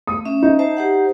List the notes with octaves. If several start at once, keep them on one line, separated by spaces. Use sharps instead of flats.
A3 D#6
C#4 E5
D#4
C5 E5 A5
G4 C5 F#5